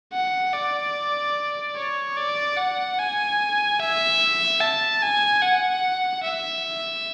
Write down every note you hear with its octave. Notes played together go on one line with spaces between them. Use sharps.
F#5
D5
C#5
D5
F#5
G#5
E5
A5
G#5
F#5
E5